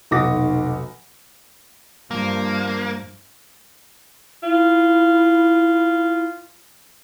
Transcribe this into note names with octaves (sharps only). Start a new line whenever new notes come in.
F1 B1 F#4 D6 D#6 A#6
G2 F3 A#3
E4 F4